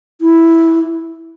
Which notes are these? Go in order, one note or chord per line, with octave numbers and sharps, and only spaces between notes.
E4